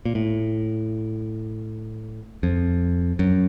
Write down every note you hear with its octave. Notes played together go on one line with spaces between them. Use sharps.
A#2
A2
F2
F#2